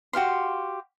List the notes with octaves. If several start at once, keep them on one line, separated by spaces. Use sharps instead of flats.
F#4 G4 F5 C6